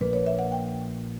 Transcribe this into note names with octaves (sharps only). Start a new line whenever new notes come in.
A#1 A#2 A#3 B4
C#5
E5
F#5
G5